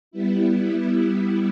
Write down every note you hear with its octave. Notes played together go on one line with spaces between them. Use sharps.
G3 B3 E4